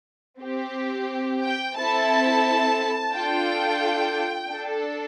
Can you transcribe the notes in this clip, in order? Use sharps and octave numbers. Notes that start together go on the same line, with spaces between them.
C4 G4
G5
C4 E4 A4 A5
D4 F4 A4 G5
D4 A4